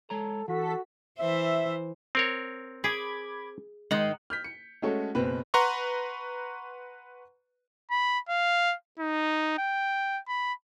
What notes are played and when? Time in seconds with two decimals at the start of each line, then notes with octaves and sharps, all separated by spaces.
0.10 G#3 A4 C#5 A#5
0.48 E3 F#4 A4 B6
1.19 E3 C5 E5
2.15 C4 A#4 C#5
2.84 G#4 B5 D6 G#6
3.91 G#2 D#3 D#4 F#5 C6
4.30 F6 G6 B6
4.44 C#7
4.82 G#3 A3 C#4 F#4 A4 C#5
5.15 F#1 B2 C4 B4 B5
5.54 B4 F#5 A#5 C6 C#6
7.90 B5
8.29 F5
8.99 D#4
9.58 G5
10.28 B5